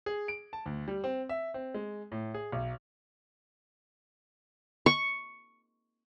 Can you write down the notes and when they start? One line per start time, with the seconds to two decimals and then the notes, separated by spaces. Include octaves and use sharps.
0.06 G#4
0.28 D7
0.53 A5
0.66 D2
0.88 G3
1.04 C4
1.29 E5
1.54 C4
1.74 G#3
2.12 A2
2.34 G#4
2.52 B1
4.86 C#6